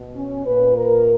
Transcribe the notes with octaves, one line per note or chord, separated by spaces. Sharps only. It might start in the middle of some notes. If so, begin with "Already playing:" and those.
Already playing: B2
C#4
A#2 B4
A#4